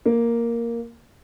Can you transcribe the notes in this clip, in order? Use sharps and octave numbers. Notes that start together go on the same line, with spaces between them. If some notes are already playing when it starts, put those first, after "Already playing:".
A#3